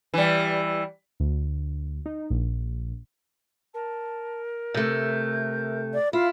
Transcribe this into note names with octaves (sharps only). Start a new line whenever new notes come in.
E3 G3
D2
D#4
A#1
A#4 A5
C3 A3 G6
D5
E4 F4 F5 B5